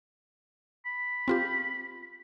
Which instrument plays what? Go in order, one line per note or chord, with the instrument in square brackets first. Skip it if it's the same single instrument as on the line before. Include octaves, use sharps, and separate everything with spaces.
[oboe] B5
[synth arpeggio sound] C4 F4 G4